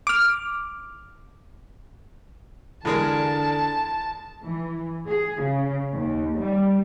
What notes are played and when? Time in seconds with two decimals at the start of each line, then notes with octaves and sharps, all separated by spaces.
0.07 D6 F6
2.85 E2 D3 G#3 A#4 A5
4.44 E3
5.07 G#4
5.43 C#3
5.94 D#2
6.38 G3